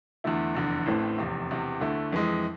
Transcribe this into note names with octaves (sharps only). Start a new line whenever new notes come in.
E2 D3 A3 E4
F1 E2 D3
A1 A2 E3 A3 C4
F1 E2 C3
E1 E2 C3
D2 D3 A3 E4
F2 E3 G#3